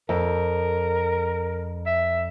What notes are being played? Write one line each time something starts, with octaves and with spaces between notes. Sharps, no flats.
F2 A#4
E5